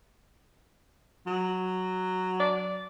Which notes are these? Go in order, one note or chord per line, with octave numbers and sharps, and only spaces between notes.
F#3
D5